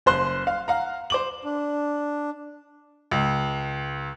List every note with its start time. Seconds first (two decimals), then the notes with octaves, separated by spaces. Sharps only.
0.06 F#1 C5 C6 F#6
0.47 F5
0.68 F5 F#5 A#5
1.10 C5 D6 F#7
1.44 D4
3.11 C#2